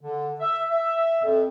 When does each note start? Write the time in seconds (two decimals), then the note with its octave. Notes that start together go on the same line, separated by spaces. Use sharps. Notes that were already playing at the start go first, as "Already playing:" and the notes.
0.01 D3
0.40 E5
0.70 E5
1.23 F2